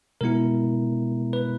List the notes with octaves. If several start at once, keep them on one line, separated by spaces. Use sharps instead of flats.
B2 G#3 B3 E4 A#4
B4